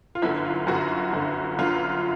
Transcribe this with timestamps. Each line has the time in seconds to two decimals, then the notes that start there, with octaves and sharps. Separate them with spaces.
0.15 F4
0.22 G1 F#2 D3 E4
0.45 F4
0.67 G1 F#2 D3 F#4
1.13 G1 F#2 D3
1.58 G1 F#2 D3 F4